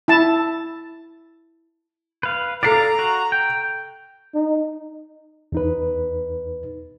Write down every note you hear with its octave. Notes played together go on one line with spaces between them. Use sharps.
E4 A5
B4 F5
A4 D5 F5 A#5 C7 D7
F#4
G5
D#4
E2 D#4 B4